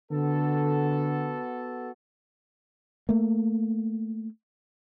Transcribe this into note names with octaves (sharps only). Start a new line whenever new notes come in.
D3 B3 F#4 A4
A3 A#3